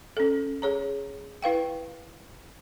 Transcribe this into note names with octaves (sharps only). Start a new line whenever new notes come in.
C#4 A4
G#4 C#5 A#5
E4 B4 F5 G5